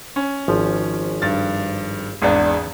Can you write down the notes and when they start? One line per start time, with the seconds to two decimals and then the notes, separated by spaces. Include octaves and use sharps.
0.16 C#4
0.48 G#1 F3
1.22 G2 A6
2.22 G#1 E2 B3 D4 G#4